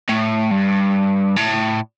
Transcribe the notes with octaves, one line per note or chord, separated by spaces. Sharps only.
A2
G2
A2